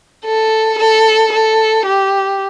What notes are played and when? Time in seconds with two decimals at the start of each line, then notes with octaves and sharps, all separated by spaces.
0.25 A4
0.79 A4
1.33 A4
1.86 G4